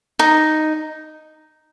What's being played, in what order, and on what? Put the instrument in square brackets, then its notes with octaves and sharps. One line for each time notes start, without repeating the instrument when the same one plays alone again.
[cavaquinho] D#4